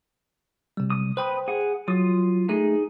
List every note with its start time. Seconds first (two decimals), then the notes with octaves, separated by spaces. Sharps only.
0.77 C3 G3
0.90 D#6
1.17 B4 C5 G5 B5 D#6
1.48 G#4 F#5
1.88 F#3 F4 D#6
2.49 A3 D#4 G#4